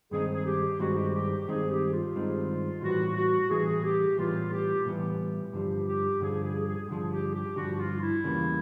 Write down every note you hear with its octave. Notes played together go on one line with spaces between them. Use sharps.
G2 D#3 G#3 C4 D#4 G#4
G#4
G4
G2 D#3 G#3 C4 D#4 F#4
G4
G4
G4
G2 D#3 G#3 C4 D#4 G#4
G4
F4
G2 D#3 G#3 C4 D#4
A2 E3 G3 B3 F#4
F#4
A2 E3 G3 B3 G#4
G4
A2 E3 G3 B3 F4
G4
A2 E3 G3 B3
G2 D3 F3 G4
G4
G2 D3 F3 G#4
G#4
G#4
G2 D3 F3 G#4
G4
G4
G2 D3 F3 F#4
F4
E4
E2 C#3 E3 G3 A#3